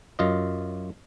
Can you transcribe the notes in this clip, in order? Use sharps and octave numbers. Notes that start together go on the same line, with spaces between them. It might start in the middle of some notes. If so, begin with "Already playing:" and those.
F#2 F4 D#5